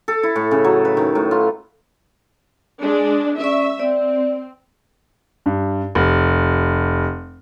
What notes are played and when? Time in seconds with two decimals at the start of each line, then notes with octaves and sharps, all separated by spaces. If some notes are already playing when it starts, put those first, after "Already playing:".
0.08 A4
0.23 E4
0.36 A2
0.51 C#3
0.64 F#3
0.85 B4
0.97 D#3
1.15 A2
1.31 F4
2.79 G#3 D4
3.40 C#4 D5 E5 C#6
3.80 C4 D5
5.46 G2
5.95 F1